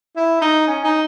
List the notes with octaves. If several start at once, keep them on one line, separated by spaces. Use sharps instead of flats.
E4
D#4
C#4
D#4